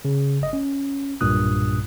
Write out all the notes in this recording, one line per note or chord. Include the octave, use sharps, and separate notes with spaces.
C#3
G1 D#5
C#4
B1 G2 A#2 D#6 F#6